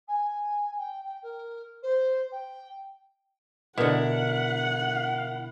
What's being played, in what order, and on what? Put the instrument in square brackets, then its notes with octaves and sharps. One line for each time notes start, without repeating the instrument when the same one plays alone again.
[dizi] G#5
G5
G5
A#4
C5
G5
[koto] B2 D3 [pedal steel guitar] E4 [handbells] A#4 [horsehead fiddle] F#5